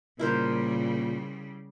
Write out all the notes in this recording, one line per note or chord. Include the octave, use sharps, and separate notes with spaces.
A#2 C#3 G3 E4 A#4 C5